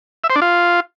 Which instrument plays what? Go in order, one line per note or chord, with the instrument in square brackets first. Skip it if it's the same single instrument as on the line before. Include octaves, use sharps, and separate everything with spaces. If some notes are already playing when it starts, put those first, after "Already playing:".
[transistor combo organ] E5
C5
D4
F4